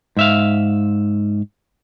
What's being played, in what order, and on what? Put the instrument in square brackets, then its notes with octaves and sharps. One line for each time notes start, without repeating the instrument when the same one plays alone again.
[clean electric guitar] G#2 E5 F5